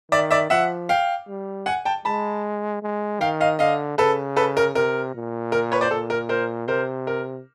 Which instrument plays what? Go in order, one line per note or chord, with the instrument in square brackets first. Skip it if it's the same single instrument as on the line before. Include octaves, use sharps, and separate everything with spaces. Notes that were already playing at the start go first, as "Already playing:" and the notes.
[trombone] D#3 [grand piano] D5 E5
[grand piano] D5 E5
[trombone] F3 [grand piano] E5 F#5
[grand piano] F5 G5
[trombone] G3
[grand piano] F#5 G#5
G5 A5
[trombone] G#3 [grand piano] A5 B5
[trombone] G#3
[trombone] D#3 [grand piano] F5 G5
[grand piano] D#5 F5
[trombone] D3 [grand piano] D#5 F5
[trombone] C#3 [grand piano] A4 B4
[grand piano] A4 B4
A#4
[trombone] C3 [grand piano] A#4
[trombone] A#2
[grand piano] A#4
B4 C#5
C5 D5
[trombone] A#2 [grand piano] A4
[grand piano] A#4
A#4 C5
[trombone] C3 [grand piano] A#4 C5
[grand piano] A#4